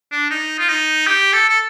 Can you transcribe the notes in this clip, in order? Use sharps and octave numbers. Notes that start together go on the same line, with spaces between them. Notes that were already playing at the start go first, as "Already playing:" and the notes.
D4
D#4
F4
D#4
G4
A4
A4